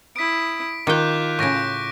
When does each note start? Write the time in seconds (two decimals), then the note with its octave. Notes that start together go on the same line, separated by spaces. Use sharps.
0.16 E4 D#6 B6 D7
0.87 D#3 F4 G5 D6 F#6 G6
1.39 A2 C#3 C#6 A#6 D7